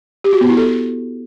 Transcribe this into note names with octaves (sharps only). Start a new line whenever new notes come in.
G4
F#4
B3
E4
A4